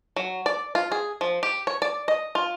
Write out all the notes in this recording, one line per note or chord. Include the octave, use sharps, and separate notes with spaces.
F#3
D5
F4
G#4
F3
G4
C#5
D5
D#5
F4